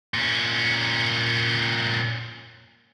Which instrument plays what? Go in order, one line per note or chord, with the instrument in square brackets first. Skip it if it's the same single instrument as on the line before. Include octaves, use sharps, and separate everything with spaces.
[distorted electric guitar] A#2 C#4